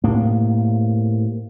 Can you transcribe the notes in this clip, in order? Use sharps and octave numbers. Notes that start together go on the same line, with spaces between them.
A2 C3 A#3